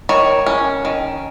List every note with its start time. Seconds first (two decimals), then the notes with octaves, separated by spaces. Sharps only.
0.09 D#3 C#5
0.46 C#4
0.85 D#3